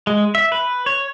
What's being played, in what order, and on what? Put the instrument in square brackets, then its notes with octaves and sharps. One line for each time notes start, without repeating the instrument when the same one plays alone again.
[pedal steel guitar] G#3
E5
B4
C#5